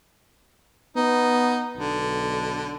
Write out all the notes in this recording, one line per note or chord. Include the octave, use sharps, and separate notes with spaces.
B3 D#4
B1 D3